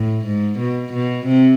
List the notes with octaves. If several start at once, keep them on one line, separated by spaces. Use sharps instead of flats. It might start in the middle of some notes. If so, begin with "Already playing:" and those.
Already playing: A2
G#2
B2
B2
C3